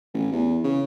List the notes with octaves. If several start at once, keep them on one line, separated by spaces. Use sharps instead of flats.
A1
E2
C#3